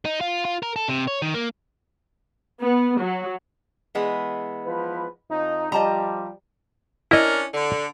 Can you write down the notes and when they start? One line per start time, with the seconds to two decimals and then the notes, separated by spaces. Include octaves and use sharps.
0.05 D#4
0.21 F4
0.45 F4
0.63 A#4
0.76 A4
0.88 C3
1.08 C#5
1.22 D#3
1.34 A#3
2.59 B3
2.99 F#3
3.95 E3 G#3 B3
4.66 F3 B4
5.30 F2 D#4
5.72 F3 G3 D#5 A5 A#5
7.11 C#4 D4 E4 A#4 D#5
7.53 D3